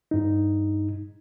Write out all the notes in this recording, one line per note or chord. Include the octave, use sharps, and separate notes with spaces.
G2 D#4